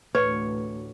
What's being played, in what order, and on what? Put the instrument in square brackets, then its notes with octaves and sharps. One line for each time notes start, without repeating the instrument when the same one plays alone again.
[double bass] A1 D2 [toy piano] B4 [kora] C#5